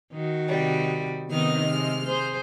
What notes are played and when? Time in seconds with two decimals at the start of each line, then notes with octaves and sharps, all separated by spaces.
0.13 D#3 F#4
0.48 C3 G3
1.30 C3 D#3 B3 D#4 F6
1.68 G#3
2.05 G#4 C5